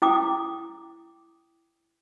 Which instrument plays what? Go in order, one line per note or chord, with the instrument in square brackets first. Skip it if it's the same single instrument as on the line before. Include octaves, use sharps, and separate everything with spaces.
[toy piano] E4 G5 D6 D#6